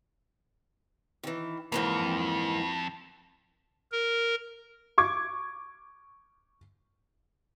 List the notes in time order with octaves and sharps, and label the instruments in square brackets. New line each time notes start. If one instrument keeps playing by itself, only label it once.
[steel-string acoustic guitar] D#3 E3
[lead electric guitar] F2 [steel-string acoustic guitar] G#2 E3 A#3
[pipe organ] A#4
[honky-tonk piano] C#6 D6 G#6